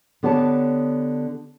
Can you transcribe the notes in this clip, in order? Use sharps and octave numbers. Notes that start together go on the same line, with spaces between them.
D3 B3 G4 C#5 F5 A5